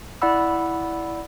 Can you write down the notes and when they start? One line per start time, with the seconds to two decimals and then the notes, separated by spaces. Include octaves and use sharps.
0.22 E4 D5 F#5 B5 E6